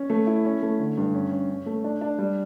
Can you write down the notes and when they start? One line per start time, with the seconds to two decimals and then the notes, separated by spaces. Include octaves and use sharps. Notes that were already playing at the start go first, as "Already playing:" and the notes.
Already playing: C#4
0.10 A3
0.27 E4
0.45 C#4
0.63 A3
0.79 D3
0.98 G2
1.14 C#4
1.31 C#4
1.49 C#4
1.66 A3
1.84 D4
2.01 D4
2.19 G3